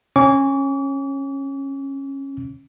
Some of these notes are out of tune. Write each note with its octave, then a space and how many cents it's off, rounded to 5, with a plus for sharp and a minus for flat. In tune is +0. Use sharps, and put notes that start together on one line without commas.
C#4 -20 D6 -45